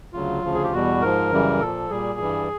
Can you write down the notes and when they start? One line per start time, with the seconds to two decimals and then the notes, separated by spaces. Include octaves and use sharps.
0.13 D2 C#3 F#3 F4
0.42 D2 C#3 F3
0.54 G#4
0.63 G4
0.72 E2 B2 G3 F#4
1.01 G#2 F3 A#4
1.31 F#2 C#3 E3 G3
1.60 A#2 F3 A4
1.90 A#2 G3 G#4
2.20 G2 E3 G3